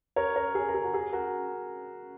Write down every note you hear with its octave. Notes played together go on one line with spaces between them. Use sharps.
A#4 C#5
A#4 C#5
G#4
A#4
G#4
F#4
G#4
F#4 A#4